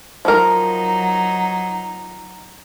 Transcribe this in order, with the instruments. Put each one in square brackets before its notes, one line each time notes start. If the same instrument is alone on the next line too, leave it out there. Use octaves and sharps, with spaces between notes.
[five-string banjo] F3 A#4 [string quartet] F#3 D#4